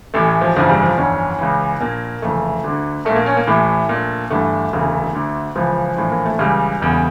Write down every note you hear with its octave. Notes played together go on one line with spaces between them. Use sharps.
A1 A2 E3 A3
F3
G1 F2 C#3 E3 F3
G3
F3
G1 F2 E3 C#4
C#2 C#3 E3
A#1 A#2 A#3
F1 F2 C#3 E3 A3
D2 D3
A#1 A#2 A3
A#3
C#4
A#3
A1 A2 E3 A3
A#1 A#2
G1 G2 E3 A3
E1 D2 C#3 E3
D2 D3
C#2 C#3 E3 F3
A#1 A2 E3
A#3
A3
C#2 C#3 E3 G3
E1 E2 C#3